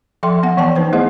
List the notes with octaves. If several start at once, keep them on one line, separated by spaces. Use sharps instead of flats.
F3 A4 E5 G5 C6
B3 F#5
E3 D5 G5 A5
B3 D#4 B4 C5 G5
A3 E4 G#4 C5 D#5 F#5